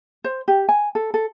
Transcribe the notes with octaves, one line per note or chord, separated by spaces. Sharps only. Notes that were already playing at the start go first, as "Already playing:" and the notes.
C5
G4
G#5
A4
A4